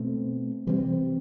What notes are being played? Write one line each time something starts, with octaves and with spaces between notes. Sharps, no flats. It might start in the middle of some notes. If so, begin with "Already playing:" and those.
Already playing: B2 A3 C4
C3 E3 G3 C4